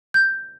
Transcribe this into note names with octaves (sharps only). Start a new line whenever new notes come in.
G6